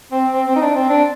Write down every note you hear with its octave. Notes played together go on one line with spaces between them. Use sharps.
C4
C4
C4
D#4
D4
C4
D4